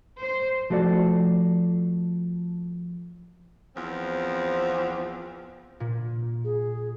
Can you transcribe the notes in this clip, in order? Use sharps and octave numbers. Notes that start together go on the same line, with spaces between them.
C5
F3 A3 F#4 A4 D5
E2 F3 C4
A#2
G#4